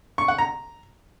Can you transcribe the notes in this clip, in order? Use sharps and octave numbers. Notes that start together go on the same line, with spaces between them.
C#6
F#5
A#5